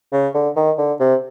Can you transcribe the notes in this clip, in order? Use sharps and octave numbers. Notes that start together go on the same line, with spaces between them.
C#3
D3
D#3
D3
C3